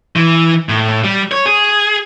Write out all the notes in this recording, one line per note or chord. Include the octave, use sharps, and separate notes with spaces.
E3
A2
G3
C#5
G#4